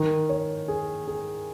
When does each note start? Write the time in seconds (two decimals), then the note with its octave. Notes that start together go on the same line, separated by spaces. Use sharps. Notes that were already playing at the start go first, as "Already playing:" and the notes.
Already playing: D#3
0.29 C#5
0.68 G#4
1.08 G#4